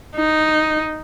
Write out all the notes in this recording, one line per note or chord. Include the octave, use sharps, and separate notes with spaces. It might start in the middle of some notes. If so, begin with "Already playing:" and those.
D#4